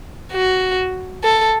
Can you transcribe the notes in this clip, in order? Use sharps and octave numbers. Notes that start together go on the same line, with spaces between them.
F#4
A4